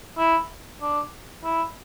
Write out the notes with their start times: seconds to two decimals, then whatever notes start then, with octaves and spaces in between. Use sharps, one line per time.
0.18 E4
0.81 D4
1.44 E4